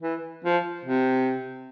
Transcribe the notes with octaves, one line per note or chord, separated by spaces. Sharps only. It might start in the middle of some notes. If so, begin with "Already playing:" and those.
E3
F3
C3